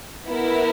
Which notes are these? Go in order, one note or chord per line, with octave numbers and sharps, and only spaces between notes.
B3 E4 A#4